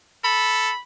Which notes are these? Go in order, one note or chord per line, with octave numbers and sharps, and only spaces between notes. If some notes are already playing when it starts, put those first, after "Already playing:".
A4 B5